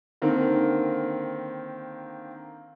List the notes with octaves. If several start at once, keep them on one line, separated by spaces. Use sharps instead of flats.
D3 D#3 A#3 C4